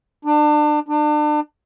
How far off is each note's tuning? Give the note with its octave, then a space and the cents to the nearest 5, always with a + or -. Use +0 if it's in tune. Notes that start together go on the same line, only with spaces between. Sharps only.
D4 +30
D4 +35